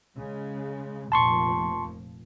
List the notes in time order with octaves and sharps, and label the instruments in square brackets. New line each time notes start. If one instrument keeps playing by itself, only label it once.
[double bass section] C#3 G#3
[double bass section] F1 A#2 F3 [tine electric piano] A5 C6 C#6